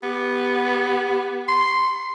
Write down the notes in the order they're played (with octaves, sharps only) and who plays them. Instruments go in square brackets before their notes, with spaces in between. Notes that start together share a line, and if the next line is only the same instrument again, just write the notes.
[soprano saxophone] B3 [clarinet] G4
[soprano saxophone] C6